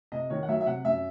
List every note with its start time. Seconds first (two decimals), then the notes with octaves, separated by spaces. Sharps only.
0.12 C3 D#5
0.30 D#3 C#5
0.43 F#5
0.49 F#3 E5
0.61 E5
0.67 C3 F#5
0.85 F#2 E5